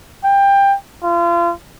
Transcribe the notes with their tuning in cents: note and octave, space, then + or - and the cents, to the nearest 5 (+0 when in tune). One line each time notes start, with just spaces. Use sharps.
G5 +20
F4 -35